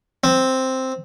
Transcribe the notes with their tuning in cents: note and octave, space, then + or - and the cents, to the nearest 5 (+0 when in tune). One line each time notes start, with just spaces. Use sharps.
C4 +0